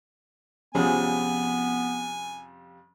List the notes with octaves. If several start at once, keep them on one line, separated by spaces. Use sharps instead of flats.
F2 C3 F3 G3 B3 C#4 G#4 G#5